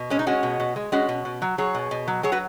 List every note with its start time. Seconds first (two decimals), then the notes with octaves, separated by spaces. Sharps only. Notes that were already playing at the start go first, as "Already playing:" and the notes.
Already playing: B2
0.10 G#3 C#4
0.19 D#4
0.26 G#3 C#4 F#4
0.43 B2
0.60 B2
0.76 G#3
0.92 G#3 C#4 F#4
1.09 B2
1.25 B2
1.42 F#3
1.58 F#3 G#4 C#5
1.75 B2
1.91 B2
2.08 F#3
2.23 F#3 G#4 C#5
2.32 F#4 B4